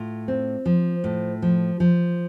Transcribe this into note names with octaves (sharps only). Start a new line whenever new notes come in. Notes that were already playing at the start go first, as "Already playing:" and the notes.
Already playing: A2 F4
C4
F3
A2
F3
F3